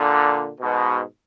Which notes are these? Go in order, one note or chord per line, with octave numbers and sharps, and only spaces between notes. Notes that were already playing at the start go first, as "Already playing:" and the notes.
Already playing: A#2 D3
G#2 B2